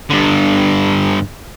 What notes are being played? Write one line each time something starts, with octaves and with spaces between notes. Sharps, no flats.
G2 D3